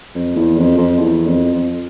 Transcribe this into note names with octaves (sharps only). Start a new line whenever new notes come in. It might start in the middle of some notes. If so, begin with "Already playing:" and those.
F2
E2
F2
F2
E2
F2
F2